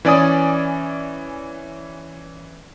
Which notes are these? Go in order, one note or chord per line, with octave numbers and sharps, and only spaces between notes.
E3 C#4 D5 G#5 D#6